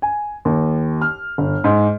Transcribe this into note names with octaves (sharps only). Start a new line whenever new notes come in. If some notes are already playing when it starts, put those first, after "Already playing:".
G#5
D#2
F6
G1
G#2